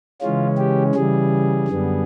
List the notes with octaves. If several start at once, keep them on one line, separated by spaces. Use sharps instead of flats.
C#3 E3 G#3 C#4 F4
G4
C#3 E3 G3 G#4
F#2 D3 G3 B3